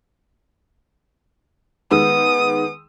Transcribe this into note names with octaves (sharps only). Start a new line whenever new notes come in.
D#3 G#3 B3 D#6 E6